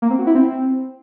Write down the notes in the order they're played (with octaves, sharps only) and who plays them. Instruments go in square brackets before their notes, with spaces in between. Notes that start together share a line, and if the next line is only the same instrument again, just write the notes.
[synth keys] A#3
C4
F#4
E4
C4